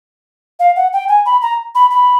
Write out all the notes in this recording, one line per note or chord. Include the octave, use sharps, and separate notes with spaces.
F5
F#5
G5
G#5
B5
A#5
B5
B5